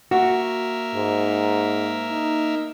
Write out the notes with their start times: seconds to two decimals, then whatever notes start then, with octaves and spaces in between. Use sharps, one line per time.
0.11 A#3 F#4 E5
0.95 G#2
2.10 D#4